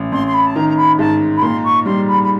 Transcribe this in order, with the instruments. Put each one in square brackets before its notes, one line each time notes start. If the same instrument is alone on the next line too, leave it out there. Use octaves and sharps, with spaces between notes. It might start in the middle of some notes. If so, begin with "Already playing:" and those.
Already playing: [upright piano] A1
[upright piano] A1 [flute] C6
[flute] C6
B5
A5
[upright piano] D#3 [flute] A#5
[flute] A#5
B5
[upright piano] G#2 [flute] A5
[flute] B5
[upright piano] A#2 [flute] C6
[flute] C#6
[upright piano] G3 [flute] C6
[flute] B5
B5